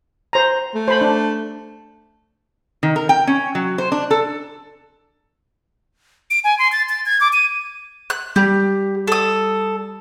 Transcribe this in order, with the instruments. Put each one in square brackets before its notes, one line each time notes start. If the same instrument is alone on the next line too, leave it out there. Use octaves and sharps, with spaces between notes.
[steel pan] C5 A#5
[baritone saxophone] A3
[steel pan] C5 B5
D4
[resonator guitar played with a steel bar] D#3
A#4
G5
C#4
F#3
C5
D4
A4
[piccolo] D7
G#5
C6
A6
A6
G#6
D6
D#7
[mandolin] F#6
[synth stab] G3 [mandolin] G4
[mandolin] A4 D#6